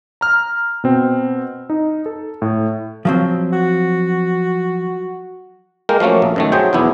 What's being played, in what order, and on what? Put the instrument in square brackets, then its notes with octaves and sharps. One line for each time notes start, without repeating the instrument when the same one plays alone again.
[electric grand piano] A#5 F6
B2 C4
D#4
A4
A2
[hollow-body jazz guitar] F3 F#3 C4
[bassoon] F#4
[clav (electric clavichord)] G#3 A#3 A#4 G5
F3 F#3 A3 A#3 C#4
A#1
F#2 D#3 A3
F#3 G#4 C5 G5
B1 E2 B3 E4